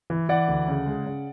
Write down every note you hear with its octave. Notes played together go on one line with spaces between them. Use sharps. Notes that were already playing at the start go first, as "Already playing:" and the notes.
E3
E3 D5 F#5
D2
C#3
G#3
C#3